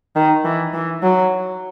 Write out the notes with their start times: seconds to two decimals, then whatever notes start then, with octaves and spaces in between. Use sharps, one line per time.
0.16 D#3
0.45 E3
0.73 E3
1.02 F#3